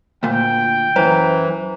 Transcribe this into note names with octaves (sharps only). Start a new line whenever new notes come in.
D2 A#2 G5
F#2 E3 C5 A#5